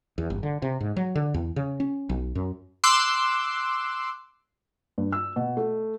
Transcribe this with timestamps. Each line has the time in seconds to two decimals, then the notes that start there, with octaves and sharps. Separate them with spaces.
0.18 E2
0.30 G1
0.43 D3
0.62 C3
0.81 G#2
0.96 F#3
1.15 D3
1.34 E2
1.56 C#3
1.80 C#4
2.09 B1
2.35 F#2
2.84 C6 D6 E6 F#6
4.98 G2
5.12 E6
5.36 B2
5.57 A3